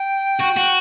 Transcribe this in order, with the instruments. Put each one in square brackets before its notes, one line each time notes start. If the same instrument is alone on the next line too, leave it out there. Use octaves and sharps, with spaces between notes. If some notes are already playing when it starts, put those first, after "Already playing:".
Already playing: [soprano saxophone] G5
[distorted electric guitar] F#4
F#4